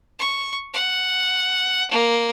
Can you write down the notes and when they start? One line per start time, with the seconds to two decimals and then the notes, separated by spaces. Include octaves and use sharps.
0.19 C#6
0.73 F#5
1.91 A#3